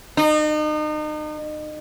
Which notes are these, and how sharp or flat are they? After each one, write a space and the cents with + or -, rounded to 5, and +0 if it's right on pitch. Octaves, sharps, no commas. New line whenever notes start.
D#4 -35